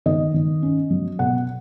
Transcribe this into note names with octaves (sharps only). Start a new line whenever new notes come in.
D#3 D#5
D#3
C#4
F#3
B2 F#5